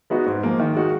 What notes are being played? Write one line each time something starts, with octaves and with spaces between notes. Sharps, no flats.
G#3 B3 D#4 F#4
G#2
F3 A#3
D#3
G#3 D#4 F#4